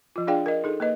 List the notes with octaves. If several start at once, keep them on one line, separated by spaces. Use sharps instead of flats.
F3 F4
D4 F4 G#4 D5 F5 G5
A#4 D#5
D#4 G#4 A4
A#3 B4 D#5